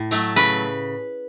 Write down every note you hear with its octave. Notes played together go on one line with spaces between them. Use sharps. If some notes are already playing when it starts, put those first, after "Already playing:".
Already playing: A2
F#3 A3
C#3 B4